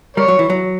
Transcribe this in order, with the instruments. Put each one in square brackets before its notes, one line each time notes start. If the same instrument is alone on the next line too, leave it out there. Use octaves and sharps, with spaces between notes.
[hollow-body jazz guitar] G3 [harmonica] A#4 C#5
[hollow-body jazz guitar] F#3
E3
F#3